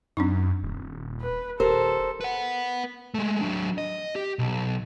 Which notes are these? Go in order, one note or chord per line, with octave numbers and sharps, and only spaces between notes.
F#2 C4 D4 D#4
D#1
B4
D#1 G4 A4 A#4 C5
B4 F#5
G#3 A3
F#3 D4
D#5
G4
B1